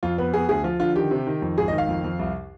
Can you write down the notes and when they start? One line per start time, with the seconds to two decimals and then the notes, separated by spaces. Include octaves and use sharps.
0.03 F2 F4
0.18 B3 B4
0.34 B3 G#4
0.49 D2 G#4
0.64 F3 F4
0.80 D3 F4
0.95 D#3 G4
1.11 C3
1.27 D#3
1.42 F2
1.58 G#1 G#4
1.68 D#5
1.73 D#3
1.78 F5
1.88 F2
2.04 F2
2.19 C2